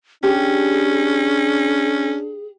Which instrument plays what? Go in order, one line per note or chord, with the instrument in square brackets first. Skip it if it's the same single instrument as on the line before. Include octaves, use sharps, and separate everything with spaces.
[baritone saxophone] C#4 [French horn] D4 [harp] G4 [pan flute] G#4